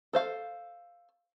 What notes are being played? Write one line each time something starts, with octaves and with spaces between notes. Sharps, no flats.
A4 C5 F5